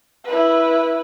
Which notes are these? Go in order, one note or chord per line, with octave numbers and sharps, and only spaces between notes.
E4 B4